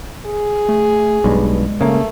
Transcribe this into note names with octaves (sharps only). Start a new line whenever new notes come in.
G#4
A3
B1 G2 G#3
C#3 A3 A#3